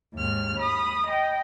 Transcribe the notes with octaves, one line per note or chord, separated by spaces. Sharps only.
D#2 G#2 F6
B5 D#6
D#5 G5